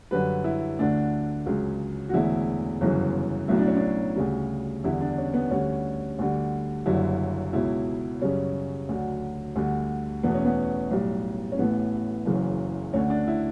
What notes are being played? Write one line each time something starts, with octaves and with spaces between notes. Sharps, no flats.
F#2 D3 G3 B4
E4
D2 D3 A3 D4
C#2 C#3 F#3
F#4
E1 E2 D3 A3 E4
G1 F#2 C#3 E3
B1 A2 F#3 A3 E4
D4
C#4
D4
D2 C#3 G3
E2 D3 G3 E4
D4
C#4
B3
D2 D3 G3 C#4
D2 D3 G3
F#1 F#2 D3 G3 E4
C#2 B2 F#3 E4
F#2 C#3 G3 C#4
D2 D3 F#3
D2 D3 G3
E2 B2 A3 B3
C#4
B3
B1 A2 G3
C#4
A1 A2 E3 A3 B3
F#1 F#2 C#3 E3
D2 D3 A3 C#4
D4
E4